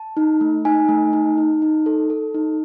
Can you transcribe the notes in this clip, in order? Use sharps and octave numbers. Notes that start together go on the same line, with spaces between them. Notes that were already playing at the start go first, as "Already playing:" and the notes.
Already playing: A5
D#4
A3
D#4 G#5
A3
D#4
D#4
D#4
A4
A4
D#4